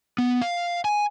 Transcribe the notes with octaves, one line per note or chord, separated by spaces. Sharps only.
B3
F5
G#5